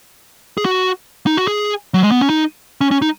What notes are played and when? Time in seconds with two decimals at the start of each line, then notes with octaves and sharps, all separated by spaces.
0.58 G#4
0.65 F#4
1.27 D#4
1.37 F#4
1.48 G#4
1.94 F#3
2.03 G#3
2.11 B3
2.21 C#4
2.30 D#4
2.81 C#4
2.91 C#4
3.02 D#4